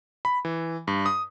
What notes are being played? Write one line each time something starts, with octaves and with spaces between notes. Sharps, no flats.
B5
E3
G2
D#6